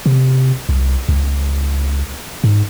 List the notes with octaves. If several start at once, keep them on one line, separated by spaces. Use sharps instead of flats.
C3
C2
C#2
G#2